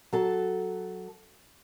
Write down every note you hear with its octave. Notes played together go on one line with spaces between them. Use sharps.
F#3 A4 A5